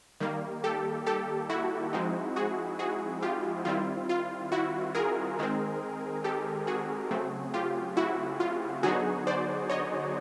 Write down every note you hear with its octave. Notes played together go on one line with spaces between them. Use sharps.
D#3 G3 A#3
G4 A4
G4 A4
E4 F#4
F3 G#3 C4 D#4
F#4 G#4
F#4 G#4
F4 G4
D#3 G3 C4 E4 F4
F4
E4 F#4
G#4 A#4
D#3 G#3 C4
G4 A4
F#4 G#4
C#3 F#3 A3 C4
F4 G4
E4 F#4
F4
D3 F#3 B3 D#4 F#4 G#4
C5 D5
C#5 D#5